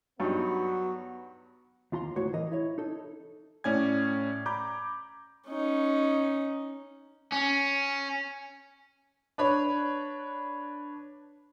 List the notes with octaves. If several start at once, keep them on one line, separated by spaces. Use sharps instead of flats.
G2 F#3 B3 D#4
D#2 F4 A#5 C6
D2 A2 F#4 C5 C#5
E3 A#4 D#5
E4 C#5
D#4 A4
A2 C#4 D5 G#5 G#6
A#5 B5 D6 G6
C#4 D#4
C#4
D4 B4 C#5 B5